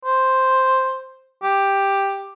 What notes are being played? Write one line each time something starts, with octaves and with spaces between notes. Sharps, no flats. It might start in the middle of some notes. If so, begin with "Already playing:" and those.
C5
G4